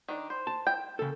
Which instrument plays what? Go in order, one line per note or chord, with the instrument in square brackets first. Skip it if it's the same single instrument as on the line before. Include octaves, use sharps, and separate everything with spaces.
[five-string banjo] D#3 D4
C5
[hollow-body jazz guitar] A5
[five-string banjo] G5
[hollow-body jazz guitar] C#3 A4